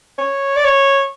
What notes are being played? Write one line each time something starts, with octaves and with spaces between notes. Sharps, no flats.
C#5
D5
C#5